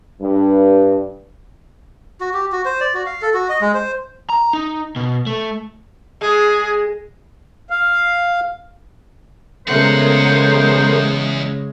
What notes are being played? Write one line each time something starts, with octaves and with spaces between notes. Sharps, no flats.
G2
F#4
G4
F#4
C5
D5
F#4
F5
A4
F#4
D#5
G#3
C5
A#5
D#4
B2
A3
G#3 G#4
F5
E2 C#3 G#3 A3 B3 A#4 C5 F#5